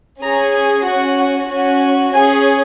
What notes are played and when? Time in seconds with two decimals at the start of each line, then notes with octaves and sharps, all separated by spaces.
0.22 C#4 G#4 A#5
0.53 G#5
0.86 C#4 F#4 F#5
1.49 C#4 F#4
2.14 C#4 G#4 G#5